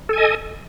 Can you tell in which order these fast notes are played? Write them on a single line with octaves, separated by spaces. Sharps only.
A4 G#5 D#5